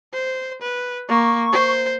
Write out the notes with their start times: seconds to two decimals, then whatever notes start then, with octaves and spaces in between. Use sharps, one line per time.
0.14 C5
0.62 B4
1.08 A#3 C#6
1.52 C5